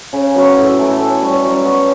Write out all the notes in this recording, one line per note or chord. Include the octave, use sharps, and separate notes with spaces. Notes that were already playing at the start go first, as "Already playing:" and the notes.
C#3
F#3 B3 F#4
A2
E3 A3
A2
G3 C#4
F#3
B3 F#4